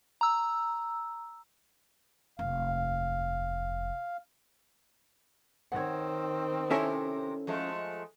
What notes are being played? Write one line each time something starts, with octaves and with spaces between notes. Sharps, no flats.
A#5 E6
F1 D#2 F5
D#3 C4 C#5 F#5
C3 C#4 E4 A4 A#4 C#5 E5 G#5
F3 G#3 A3